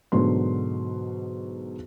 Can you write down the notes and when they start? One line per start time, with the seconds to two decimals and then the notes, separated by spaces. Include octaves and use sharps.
0.12 G#2 B2 D3 F#3 B3 C6